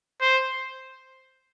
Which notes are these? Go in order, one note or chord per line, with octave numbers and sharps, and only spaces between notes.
C5